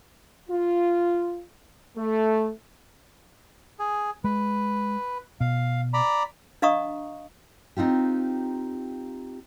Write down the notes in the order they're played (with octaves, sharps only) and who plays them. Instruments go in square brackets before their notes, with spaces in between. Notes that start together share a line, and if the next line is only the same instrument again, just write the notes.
[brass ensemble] F4
A3
[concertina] G#4
[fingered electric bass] G#3 [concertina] B4
[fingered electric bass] B2 [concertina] F5
[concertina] D5 A#5 B5
[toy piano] D4 D#5 F5 A#5 C#6 D#6
[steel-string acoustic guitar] C4 D#4 F4 G4